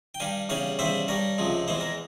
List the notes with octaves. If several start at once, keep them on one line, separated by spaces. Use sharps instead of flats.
G5
G2 G3 F5 G#5
E2 C#3 G3 C#5 F5
E2 C#3 G3 C5 E5
G2 G3 A#4 C#5
C#2 C3 F3 G#3
E2 E3 G#3 C5
A#4